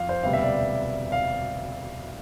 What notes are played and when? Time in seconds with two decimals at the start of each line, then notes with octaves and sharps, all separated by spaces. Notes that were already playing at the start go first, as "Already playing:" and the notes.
Already playing: F2 F4 F5
0.09 C5
0.23 E1 D2 C3 G3 B3 F5
0.33 E5
0.43 D5
1.12 F5